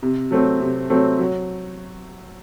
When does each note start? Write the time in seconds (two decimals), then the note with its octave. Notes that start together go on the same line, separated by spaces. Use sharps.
0.02 C3
0.31 F#3 A3 C4
0.61 C3
0.90 F#3 A3 C4
1.19 F#3